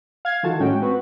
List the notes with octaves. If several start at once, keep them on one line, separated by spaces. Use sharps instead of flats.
F5 G#6
D#3 E3 F4 F#4 A4 A5
A2 G#3 C#4 F#4 G5
C4 F#4 B4